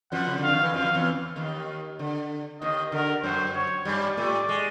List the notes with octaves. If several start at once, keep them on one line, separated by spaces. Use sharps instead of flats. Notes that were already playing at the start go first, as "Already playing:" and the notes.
F2 F3 F#5
C#3
D3 F5
D#3
E3
F2 F3 F5
E2 E3
D#2 D#3
D3
D#2 D#3 D#5
D3 A#4
F#2 F#3 C5
C#5
G2 G3 D5
A2 A3
G#3